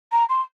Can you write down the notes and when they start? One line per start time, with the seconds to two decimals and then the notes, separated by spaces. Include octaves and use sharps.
0.12 A#5
0.29 C6